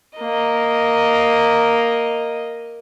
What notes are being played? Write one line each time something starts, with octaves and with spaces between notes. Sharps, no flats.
A#3 D#5